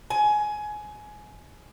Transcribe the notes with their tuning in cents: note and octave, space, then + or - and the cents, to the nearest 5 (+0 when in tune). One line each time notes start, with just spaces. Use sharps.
G#5 +20